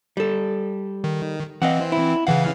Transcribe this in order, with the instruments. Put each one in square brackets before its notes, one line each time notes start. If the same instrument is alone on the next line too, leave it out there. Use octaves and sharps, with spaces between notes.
[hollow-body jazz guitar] G3 A4
[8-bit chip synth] D#3
[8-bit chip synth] E3 C4 [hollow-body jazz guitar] D#5 F5 F#5
[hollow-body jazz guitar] E4
[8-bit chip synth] C#3 E3 F5 [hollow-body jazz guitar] F#5